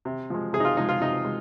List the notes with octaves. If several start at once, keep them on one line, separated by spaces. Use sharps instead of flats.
C3
F3 G#3
C3 G#4
D#4
F4
F3 G#3 D#4
F4
C3 D#4
G#3